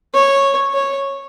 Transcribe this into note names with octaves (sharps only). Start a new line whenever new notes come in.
C#5
C#5